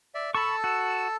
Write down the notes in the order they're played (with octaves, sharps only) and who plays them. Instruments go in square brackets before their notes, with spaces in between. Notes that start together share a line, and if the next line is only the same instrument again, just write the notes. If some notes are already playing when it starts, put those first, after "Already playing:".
[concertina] D5 E5
[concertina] A4 A5 E6 [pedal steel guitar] B5 C#6
[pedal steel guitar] F#4